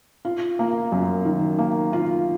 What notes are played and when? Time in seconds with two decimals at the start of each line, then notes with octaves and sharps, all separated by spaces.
0.25 F4
0.59 A#3
0.92 F#2
1.25 D#3
1.59 A#3
1.93 F4